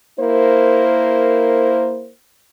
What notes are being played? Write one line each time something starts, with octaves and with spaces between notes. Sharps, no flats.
A#3 E4 A#4 C5